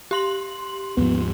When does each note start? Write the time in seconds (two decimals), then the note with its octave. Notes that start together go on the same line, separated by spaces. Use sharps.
0.11 G4 C6 F#7
0.97 D#2 G#2 F3 B3